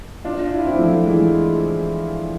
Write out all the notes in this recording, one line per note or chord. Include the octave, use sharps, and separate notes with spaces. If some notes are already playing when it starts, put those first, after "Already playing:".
D4 F4
E4
F4
C4 E4
F3 A3
E3 G#3